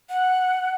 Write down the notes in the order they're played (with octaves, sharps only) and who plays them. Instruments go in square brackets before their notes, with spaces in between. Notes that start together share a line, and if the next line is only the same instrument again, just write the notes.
[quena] F#5